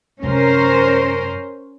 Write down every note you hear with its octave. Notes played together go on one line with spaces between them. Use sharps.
F#2 C3 C#4 A#4 C5